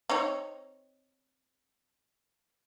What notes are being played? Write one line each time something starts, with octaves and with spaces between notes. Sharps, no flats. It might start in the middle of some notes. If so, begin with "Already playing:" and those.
C4 D#4 C#5